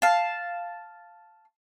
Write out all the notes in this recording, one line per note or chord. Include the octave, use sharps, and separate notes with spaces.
F5 A5